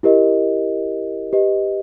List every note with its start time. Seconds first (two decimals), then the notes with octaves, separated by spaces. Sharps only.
0.03 E4 G4 A#4 D#5
1.33 G4 B4 D#5